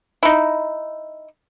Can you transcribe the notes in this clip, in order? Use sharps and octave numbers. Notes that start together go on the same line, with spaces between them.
D#4 E4